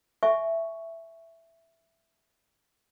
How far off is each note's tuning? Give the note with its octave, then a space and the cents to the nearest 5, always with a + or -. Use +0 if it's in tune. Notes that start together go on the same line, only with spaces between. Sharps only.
E5 +5 G#5 +25 C#6 +0